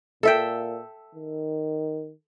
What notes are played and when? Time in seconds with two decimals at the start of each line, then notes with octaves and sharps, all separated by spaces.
0.23 A#2 A4 E5 G5
1.15 D#3